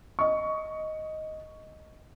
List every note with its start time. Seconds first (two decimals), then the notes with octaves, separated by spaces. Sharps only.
0.19 D#5 C#6